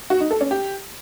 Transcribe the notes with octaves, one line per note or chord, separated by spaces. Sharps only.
F#4
D#4
A4
C#4
G4